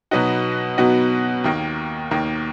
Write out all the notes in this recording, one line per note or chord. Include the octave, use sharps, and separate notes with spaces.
B2 F#3 B3 D#4 F#4
B2 F#3 B3 D#4 F#4
D#2 D#3 A#3
D#2 D#3 A#3